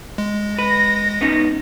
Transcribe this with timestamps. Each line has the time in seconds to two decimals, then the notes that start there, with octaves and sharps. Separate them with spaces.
0.18 G#3
0.58 B4 A#6
1.21 B3 C#4 D#4